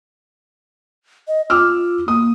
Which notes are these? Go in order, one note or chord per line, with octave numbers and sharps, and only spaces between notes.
D#5
F4 D6 E6 F6
A#3 D#6